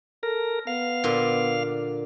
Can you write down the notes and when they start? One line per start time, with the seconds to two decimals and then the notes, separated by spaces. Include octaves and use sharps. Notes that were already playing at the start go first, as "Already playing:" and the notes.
0.23 A4 A#4
0.67 B3 F5
1.04 A#2 D3 C6